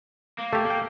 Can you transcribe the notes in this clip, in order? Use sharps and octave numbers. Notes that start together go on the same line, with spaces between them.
A#3
A3 G4
G5